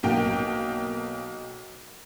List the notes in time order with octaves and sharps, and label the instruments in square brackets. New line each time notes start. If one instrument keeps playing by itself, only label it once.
[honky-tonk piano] B1 A#3 G5